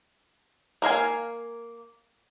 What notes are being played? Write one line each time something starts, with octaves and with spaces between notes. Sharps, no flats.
A#3 A#4 F5 G#5